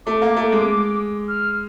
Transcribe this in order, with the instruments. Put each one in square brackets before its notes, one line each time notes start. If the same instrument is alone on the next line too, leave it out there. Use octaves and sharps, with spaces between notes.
[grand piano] A3 [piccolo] D6
[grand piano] A#3
A3
G#3
[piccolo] F6